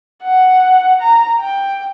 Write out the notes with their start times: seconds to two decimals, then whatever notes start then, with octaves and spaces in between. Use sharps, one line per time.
0.23 F#5
1.00 A#5
1.40 G5